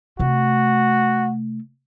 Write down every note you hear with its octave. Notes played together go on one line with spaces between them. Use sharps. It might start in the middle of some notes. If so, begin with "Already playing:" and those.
C3 A3 F#4